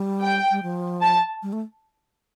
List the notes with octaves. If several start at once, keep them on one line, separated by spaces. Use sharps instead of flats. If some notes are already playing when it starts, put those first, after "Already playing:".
Already playing: G3
G5
G3
F3
A5
G3
A3